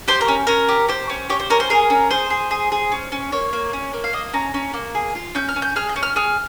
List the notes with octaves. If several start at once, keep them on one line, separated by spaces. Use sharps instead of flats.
G4 C5
A#4
C#4
C#4 A#4
G4
G4 C5
C#4
G4 C#5
C5
C#4 A#4
C5
G#4 A#4
C#4
G#4 C5
G#4
G#4
G#4
C#4
C#4
A#3 C#5
A#3
C#4
A#3
F5
A#3 D#5
C#4 A#5
C#4
A#3
G#4
F4
C#4 G6
F6
C#4
G6
G#4 F6
G6
C#4
F6
G#4 F6